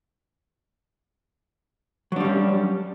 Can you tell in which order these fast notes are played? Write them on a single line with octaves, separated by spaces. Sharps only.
F#3 D4 G3 C#4